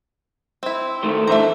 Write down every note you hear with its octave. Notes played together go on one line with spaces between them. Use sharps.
C4 E4
D#3 A3 C5
D3 E3 A3 C5 E5 A#5